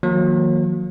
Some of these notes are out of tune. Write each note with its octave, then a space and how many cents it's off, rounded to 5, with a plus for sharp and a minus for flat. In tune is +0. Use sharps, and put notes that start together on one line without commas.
D#3 +25 F#3 -35 A#3 +0